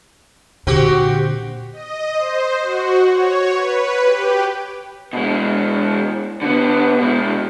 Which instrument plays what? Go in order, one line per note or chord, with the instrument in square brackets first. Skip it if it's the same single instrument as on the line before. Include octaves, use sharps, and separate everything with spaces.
[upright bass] A#2 D3 [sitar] C4 F#4 G4
[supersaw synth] D#5
C5
F#4
C#5
B4
G4
[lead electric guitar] B2 G#3
D3 B3
B2 G#3